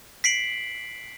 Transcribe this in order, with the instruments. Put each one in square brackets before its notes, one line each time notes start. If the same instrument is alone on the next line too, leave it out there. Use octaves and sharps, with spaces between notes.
[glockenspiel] B6 C7 D7 F#7